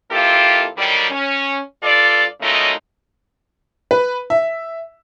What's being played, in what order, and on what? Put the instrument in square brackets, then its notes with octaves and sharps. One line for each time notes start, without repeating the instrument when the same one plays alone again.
[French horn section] F2 A#3 E4 F4 G4 A4
D3 D#3 F#3 G3
C#4
G2 F4 A4 D5
A#2 C#3 F#3 G#3 A3 D#4
[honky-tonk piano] B4
E5